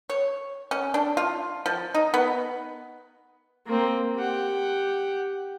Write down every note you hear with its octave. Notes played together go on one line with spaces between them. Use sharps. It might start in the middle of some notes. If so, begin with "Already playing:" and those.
C#5
C#4
D4
F4
F3
D#4
B3
A#3 C4
G4 F#5